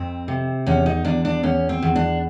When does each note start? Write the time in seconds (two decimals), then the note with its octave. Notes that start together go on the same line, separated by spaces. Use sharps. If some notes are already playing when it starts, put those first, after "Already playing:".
Already playing: F2 C4
0.28 C3
0.66 E2 C#4
0.86 D#4
1.05 E2 D4
1.25 D4
1.43 E2 C#4
1.69 C4
1.82 E2
1.96 D4